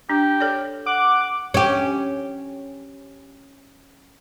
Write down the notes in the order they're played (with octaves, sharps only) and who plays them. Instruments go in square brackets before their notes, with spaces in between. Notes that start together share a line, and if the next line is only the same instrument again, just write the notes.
[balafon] D4 [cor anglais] G4
[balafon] A4 C#5 D5
[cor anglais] F#5 [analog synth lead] D6
[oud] C#4 G4